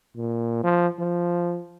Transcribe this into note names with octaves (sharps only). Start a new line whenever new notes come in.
A#2
F3
F3